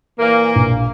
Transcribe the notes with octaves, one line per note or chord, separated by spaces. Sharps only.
A#2 E3 A#3
A#1